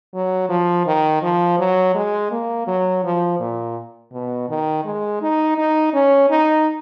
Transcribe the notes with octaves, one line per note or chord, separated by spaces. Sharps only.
F#3
F3
D#3
F3
F#3
G#3
A#3
F#3
F3
A#2
B2
D#3
G#3
D#4
D#4
C#4
D#4